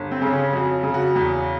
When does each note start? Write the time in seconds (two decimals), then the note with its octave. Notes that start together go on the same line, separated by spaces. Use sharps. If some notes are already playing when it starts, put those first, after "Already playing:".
Already playing: G1
0.11 C4
0.22 C#3
0.33 C#4
0.52 F2 F#4
0.83 C#3
0.94 F#4
1.15 E2